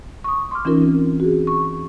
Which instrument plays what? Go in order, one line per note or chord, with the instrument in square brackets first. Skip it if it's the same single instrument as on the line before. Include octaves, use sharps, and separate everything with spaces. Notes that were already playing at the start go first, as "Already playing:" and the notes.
[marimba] C#6 D#6
C6 D6 F6
E3 C#4 D#4 F4 A#4
C4
F#4 G#4
C#6